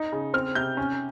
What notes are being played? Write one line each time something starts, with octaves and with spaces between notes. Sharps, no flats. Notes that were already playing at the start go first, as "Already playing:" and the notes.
Already playing: D#4
C#3
C4 F6
C3 G6
C#4